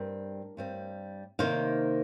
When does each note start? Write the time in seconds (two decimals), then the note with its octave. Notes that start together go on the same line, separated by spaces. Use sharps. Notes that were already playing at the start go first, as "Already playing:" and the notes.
Already playing: G2 G3 C4 A#4
0.57 G2 G3 C4
1.39 C3 D#3 A#3 D#4 C5 F5